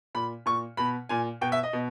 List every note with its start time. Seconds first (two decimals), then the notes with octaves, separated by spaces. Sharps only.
0.15 A#2 B5
0.46 A#2 C#6
0.77 B2 B5
1.09 A#2 G#5
1.41 B2 G5
1.52 E5
1.63 D#5
1.73 B2